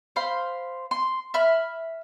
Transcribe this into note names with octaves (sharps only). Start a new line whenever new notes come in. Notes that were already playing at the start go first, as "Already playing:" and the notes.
C5 F5 B5 C6
C6
E5 B5 F6